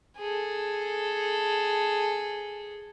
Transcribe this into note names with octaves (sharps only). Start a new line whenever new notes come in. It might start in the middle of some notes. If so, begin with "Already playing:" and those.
G#4 A4